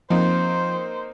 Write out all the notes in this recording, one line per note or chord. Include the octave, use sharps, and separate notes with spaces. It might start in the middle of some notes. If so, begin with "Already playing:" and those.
F3 A#3 C4 D#4 C5